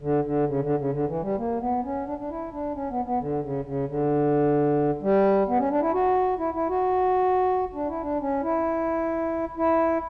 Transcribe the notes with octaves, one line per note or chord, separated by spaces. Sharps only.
D3
D3
C#3
D3
C#3
D3
E3
G3
A#3
B3
C#4
D4
D4
E4
D4
C#4
B3
B3
D3
C#3
C#3
D3
G3
B3
C#4
D4
E4
F#4
E4
E4
F#4
D4
E4
D4
C#4
E4
E4